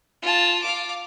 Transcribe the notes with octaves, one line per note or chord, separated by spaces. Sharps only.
F4 A5
F5 D6